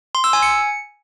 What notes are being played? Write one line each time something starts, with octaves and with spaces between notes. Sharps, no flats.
C6
E6
G#5
C#7